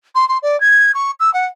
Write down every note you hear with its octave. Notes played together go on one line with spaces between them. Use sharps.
C6
C6
D5
G#6
C#6
E6
F#5